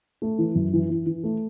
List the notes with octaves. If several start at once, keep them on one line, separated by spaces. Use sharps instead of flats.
A3
E3
F#2
E3
E3
E3
A3